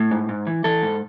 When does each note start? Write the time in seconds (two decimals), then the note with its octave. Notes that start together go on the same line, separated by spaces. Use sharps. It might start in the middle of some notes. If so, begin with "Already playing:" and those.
Already playing: A2
0.11 G#2
0.29 G#2
0.47 E3
0.64 E3 A4
0.83 G#2